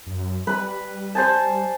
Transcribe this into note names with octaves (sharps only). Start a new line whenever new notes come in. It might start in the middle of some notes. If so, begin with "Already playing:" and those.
F#2
G3 B4 B5
C5 G#5 A5